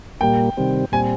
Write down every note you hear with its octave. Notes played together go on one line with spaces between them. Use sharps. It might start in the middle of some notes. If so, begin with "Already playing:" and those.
A#2 G3 A#3 G5
C3 D#3 G3 C4
A#2 G3 C4 G#5